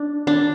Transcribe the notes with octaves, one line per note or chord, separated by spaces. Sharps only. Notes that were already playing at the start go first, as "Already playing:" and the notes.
Already playing: D4
D4